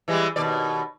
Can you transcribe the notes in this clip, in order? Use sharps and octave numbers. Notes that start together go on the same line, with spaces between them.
E3 G3 G#3
D#2 B2 D5